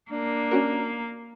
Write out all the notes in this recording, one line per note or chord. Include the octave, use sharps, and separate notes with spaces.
A#3 D4
C#4 F#4 A#4